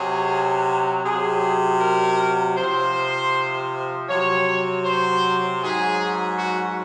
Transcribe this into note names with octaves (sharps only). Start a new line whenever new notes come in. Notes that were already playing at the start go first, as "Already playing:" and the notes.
Already playing: C3 F#3 G#4
C3 F#3 G#4
A#4
C3 F3 C5
C3 F#3 C#5
C5
G#2 F#3 G#4
F#4